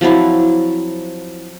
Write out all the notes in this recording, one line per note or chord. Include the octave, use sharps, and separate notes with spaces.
F3 F#3 C4 E4